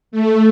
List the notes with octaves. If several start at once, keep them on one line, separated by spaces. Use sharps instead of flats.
A3